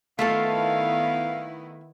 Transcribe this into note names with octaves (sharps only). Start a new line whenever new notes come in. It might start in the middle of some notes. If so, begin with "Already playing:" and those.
D#3 A3 B3 E4 F4 A4 F5